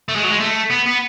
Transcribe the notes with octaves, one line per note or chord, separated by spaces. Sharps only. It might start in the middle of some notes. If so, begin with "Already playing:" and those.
A3
G#3
F#3
G#3
A3
B3
B3